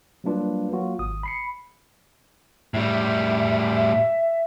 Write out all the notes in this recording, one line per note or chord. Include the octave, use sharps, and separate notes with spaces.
F#3 G3 A#3 D4 F4 B4
F#3 A#3 F4 F#4
G#1 D#6
B5 C7 C#7
A2 G3 E5